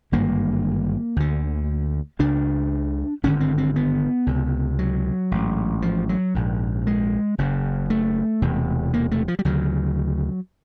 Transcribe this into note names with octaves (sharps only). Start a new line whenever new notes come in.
G#1 G2 D3 A#3
D2 D3
C#2 C#3 D4
G#1 G2 D3 C#4
C4
C4
B3
C#2 C3
F#3
A1 G#2
F3
F#3
A#1 G#2
G#3
F#1 F#2 C#3
A3
E1 E2 C3
A#3
A3
F3
G3
D2 C#3 F#3